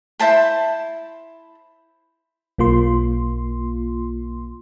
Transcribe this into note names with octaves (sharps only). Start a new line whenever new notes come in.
E4 C5 A5 B5
B1 A#3 F4 C6